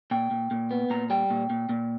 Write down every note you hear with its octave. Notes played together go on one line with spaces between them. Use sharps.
A#2 G5
A#2
A#2
B3
A#2 A#5
G3 G5
A#2
A#2
A#2